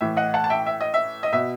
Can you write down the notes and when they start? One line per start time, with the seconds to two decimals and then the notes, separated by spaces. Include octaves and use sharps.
0.01 A2 E3 E5
0.17 D#5 F#5
0.34 F#5 A5
0.44 A5
0.50 E5 G5
0.66 E5
0.81 D#5
0.94 E5
1.23 D#5
1.33 B2 E5